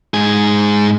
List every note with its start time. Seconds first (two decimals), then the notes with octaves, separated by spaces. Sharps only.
0.14 G#2 G#4